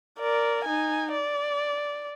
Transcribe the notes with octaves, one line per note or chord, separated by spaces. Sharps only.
A#4 D5
D#4 G#5
D5